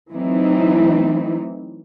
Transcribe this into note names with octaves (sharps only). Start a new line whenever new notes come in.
E3 F#3 A3 C4 D#4 E4